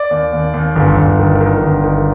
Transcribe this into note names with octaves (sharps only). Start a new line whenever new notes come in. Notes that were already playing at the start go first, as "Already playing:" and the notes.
Already playing: D5
D#2
D#2
D#2
G1
G1
D#3
D#3
G1
D#3